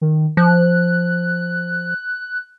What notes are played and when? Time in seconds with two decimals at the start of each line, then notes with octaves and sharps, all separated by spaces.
0.01 D#3
0.37 F3 F#6